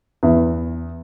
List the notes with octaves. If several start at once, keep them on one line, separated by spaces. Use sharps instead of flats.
E2